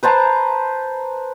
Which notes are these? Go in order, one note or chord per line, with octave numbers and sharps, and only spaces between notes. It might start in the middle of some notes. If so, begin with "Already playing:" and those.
B4 C5 A5 A#5